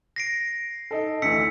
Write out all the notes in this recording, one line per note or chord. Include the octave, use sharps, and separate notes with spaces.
A#6 C7 D7
D#4 A4
D2 E3 E6 B6 C#7